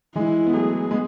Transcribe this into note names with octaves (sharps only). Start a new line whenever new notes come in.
E3 G#3 E4
B3
F#3 A3 G#4
G#3 B3